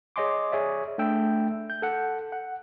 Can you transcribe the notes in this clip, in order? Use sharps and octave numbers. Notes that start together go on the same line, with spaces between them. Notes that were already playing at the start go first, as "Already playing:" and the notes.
G#4 C#5 D#5 G#5 C6 D6
G#4 C#5 D5 E5
A3 D4 E5 G5 E6
G6
A4 F#5
F#5